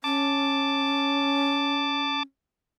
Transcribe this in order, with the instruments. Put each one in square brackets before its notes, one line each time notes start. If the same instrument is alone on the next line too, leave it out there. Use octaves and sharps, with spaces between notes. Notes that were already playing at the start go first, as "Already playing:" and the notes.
[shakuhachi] C#4 [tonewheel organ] A5 D6